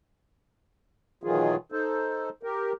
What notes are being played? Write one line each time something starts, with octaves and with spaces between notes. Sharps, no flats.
B2 D#3 E3 F#3 F4 G#4
D#4 A4 C5
G4 A#4